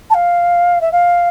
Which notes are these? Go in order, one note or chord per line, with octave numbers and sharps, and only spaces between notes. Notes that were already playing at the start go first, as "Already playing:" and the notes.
A5
F5
E5
F5